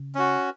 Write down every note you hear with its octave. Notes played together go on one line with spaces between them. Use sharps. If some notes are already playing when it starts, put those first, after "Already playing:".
Already playing: C#3
C#4 F#4